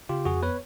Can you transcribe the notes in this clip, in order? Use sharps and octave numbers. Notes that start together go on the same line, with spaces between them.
C#3 F4 G4
F2 F#4 G#4
B3 B4 C#5